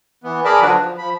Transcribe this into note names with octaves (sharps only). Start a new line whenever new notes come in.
E3 B3
G#4 A#4 D5 A5 B5
D3 F3 F#3 D4 F#4 B4
F3
F3 B5